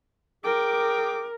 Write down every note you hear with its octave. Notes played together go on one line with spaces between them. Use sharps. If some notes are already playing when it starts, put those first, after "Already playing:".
G#4 A#4 G5 D6